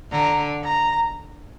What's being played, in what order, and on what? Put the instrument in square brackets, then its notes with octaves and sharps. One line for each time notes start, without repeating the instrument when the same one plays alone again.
[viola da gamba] D3 [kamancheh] A#5
[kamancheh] A#5